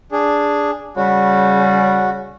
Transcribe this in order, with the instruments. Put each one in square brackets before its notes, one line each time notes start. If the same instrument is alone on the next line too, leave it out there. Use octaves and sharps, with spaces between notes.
[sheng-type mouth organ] D4 G#4
[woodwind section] C#3 G3 [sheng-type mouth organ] F#4